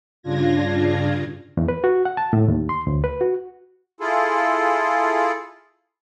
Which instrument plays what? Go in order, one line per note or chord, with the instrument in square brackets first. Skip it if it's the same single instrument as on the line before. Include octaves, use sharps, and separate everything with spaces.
[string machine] G2 C#3 D4 F4 G#6 A#6
[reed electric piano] E2
B4
F#4
F#5
A5
A2
D#2
C6
D2
B4
F#4
[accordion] E4 F4 G#4 A4